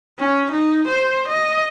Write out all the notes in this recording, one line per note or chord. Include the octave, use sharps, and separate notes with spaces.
C#4
D#4
C5
D#5